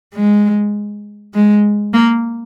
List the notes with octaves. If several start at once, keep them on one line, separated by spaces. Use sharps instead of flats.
G#3
G#3
A#3